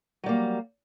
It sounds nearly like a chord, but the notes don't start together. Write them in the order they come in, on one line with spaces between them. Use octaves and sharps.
F#3 G3 A#3